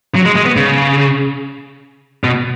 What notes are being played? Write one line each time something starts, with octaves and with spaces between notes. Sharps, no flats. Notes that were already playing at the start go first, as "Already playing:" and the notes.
F#3
G#3
G#3
B3
C#3
B2